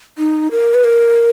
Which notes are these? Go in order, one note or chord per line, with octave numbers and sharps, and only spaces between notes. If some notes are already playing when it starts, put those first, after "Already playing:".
D#4
A#4
B4
A#4